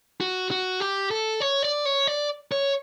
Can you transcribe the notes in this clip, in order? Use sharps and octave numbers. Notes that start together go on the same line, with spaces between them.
F#4
F#4
G4
A4
C#5
D5
C#5
D5
C#5